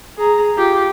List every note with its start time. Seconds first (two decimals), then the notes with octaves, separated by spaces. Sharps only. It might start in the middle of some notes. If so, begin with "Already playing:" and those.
0.18 G#4 A#5
0.55 F4 G4